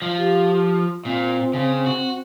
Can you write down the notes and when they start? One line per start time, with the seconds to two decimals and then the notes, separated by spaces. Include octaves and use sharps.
0.02 F3
0.18 G4
1.05 A#2 C4
1.54 C#3
1.86 F#4